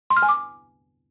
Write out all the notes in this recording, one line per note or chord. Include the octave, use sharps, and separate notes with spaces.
C6
F6
G#5
D6